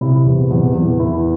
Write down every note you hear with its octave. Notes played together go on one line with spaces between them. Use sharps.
C3 E4
E2
E2
E2
E3 E4